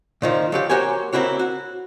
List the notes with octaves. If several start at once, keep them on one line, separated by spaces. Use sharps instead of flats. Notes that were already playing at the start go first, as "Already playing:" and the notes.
A#2 D#3 F3
F3 F#3 G4
A#3 F#4 G4 C5 C#5 G#5
A#3 C4 E4 F#4 C#5
F#4